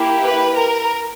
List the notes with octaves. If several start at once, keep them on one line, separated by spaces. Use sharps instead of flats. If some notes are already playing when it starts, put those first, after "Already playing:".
Already playing: A#3 E4 G4
B4
A#4